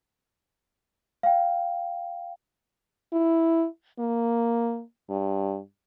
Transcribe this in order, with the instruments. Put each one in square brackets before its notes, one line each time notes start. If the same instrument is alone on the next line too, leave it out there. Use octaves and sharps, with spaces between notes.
[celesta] F5 G5
[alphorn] E4
A#3
G2